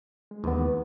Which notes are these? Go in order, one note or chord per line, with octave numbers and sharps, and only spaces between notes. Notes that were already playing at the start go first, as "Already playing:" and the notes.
G#3
D#2 E3 G#3 B3